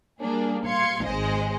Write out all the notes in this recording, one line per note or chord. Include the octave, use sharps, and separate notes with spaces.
G3 A#3 D4 G#4
F5 C6 G#6 C#7
G#1 G#3 C5 D#5